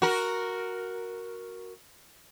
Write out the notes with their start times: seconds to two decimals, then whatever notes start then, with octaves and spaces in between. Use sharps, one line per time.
0.02 F#4 A#4